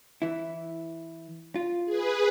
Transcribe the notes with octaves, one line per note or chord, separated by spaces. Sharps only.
E3 E4
F4
G#4 B4